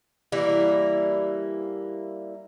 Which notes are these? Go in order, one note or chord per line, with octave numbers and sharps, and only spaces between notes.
E3 G3 A#3 E4